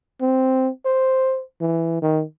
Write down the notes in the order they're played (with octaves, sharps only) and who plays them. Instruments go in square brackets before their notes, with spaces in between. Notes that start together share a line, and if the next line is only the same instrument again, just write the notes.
[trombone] C4
C5
E3
D#3